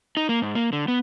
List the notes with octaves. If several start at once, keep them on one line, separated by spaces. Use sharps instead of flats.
D#4
A#3
G#2
A#3
D3
B3